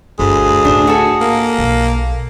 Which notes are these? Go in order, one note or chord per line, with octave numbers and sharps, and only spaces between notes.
G1 D2 G#4
A2 D4
F#4 A4
A#3
B1